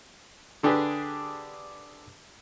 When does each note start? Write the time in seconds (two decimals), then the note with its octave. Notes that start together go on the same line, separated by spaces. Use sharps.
0.63 D3 D4 G4 G#4 B4